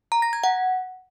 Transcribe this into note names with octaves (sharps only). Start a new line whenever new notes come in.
A#5
A#6
G#6
F#5